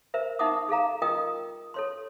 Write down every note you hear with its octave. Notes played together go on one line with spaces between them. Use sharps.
A#4 C5 E5
D#4 E5 F#5 D6 D#6
G#4 A4 F5 A#5
F4 A#4 D#5 G5 D#6
A4 C#5 C6